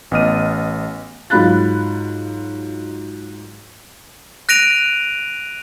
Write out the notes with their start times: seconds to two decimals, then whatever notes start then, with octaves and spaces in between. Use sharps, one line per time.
0.11 A1 B3 D#5 F6 D#7
1.30 G#2 F#3 F4 B5 F#6 A6
4.49 F#6 A#6 D7 D#7 F7